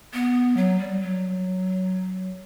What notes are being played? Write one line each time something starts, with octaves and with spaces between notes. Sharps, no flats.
B3
F#3
G3
F#3